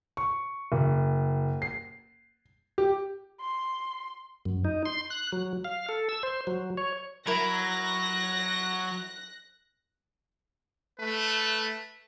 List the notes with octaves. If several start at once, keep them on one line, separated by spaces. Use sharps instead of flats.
C#6
F#1
C7
G4
C6
F#2
D#4
C6
F#6
F#3
F5
A4
E6
C5
F#3
C#5
F#3 E4 A#4 F#6 A#6
A3 B4